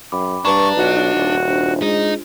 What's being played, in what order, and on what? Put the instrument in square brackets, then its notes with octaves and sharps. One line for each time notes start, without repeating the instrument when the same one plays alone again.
[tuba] F#2 [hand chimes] G5 B5 D6
[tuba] G2 [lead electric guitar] D4 [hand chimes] B4 A5 A#5 [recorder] C#6
[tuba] B1 [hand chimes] D#4 F4 D#5 [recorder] F#4
[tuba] D#1
[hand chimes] D4 F4 C5
[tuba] G#3 [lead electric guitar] D#4